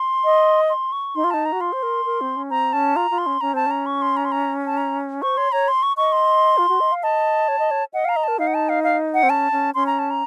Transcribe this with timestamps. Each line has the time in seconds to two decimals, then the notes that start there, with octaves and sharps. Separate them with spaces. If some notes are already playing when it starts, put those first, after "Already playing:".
Already playing: C6
0.25 D#5
0.70 C6
0.92 C#6
1.15 D#4 C6
1.24 F4
1.31 D#4 A5
1.46 A#5
1.52 F#4
1.60 F4 C6
1.73 C5
1.83 A#4
2.05 A#4
2.21 C4
2.36 C#4
2.50 C4 A#5
2.73 C#4 A5
2.96 F4 A#5
3.11 F4
3.18 C6
3.26 C#4
3.41 C#4 A#5
3.54 C4 A5
3.66 C#4 A#5
3.86 C#6
4.02 C6
4.17 A#5
4.25 C6
4.32 A#5
4.66 A5
4.77 A#5
5.22 C5 C#6
5.37 C#5 C6
5.52 C#5 A#5
5.68 C6
5.83 C#6
5.97 D#5 C#6
6.12 C6
6.58 F4
6.69 F#4
6.80 D#5
6.92 F5
7.03 D#5 A5
7.48 C#5
7.59 D#5
7.71 C#5
7.94 D#5 F#5
8.05 F5 A#5
8.16 D#5
8.24 A#4 A5
8.39 D#4 F5
8.47 F#5
8.54 A5
8.69 F5
8.84 F5
9.14 F#5
9.23 C4
9.30 C#4 A5
9.52 C#4
9.75 C#4 C6
9.87 A#5
9.99 A5
10.10 A#5